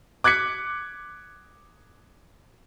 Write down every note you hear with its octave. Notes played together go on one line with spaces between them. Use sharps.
D6 F#6 G#6 B6 C#7